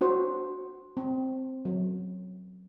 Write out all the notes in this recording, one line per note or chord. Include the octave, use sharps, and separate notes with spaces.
D4 F#4 C5
C4
F#3